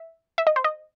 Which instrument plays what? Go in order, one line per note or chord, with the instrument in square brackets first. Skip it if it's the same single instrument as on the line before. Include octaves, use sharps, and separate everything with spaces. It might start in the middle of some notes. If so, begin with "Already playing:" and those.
Already playing: [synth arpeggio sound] E5
E5
D#5
C5
D#5